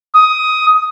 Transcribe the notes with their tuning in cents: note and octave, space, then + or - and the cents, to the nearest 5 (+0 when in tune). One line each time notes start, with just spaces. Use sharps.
D#6 +15